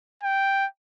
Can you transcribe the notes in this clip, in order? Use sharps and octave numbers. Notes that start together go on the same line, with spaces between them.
G5